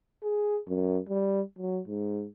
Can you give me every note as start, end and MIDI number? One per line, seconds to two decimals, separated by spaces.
0.23 0.58 68
0.68 0.99 42
1.09 1.41 55
1.58 1.80 54
1.87 2.26 44